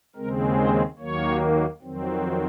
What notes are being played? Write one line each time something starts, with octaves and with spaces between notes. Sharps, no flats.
D#2 C#3 G#3 C4 A#4
C5
D#2 D#3 F#3 A#3 C#5
F2 D#3 F#3 C4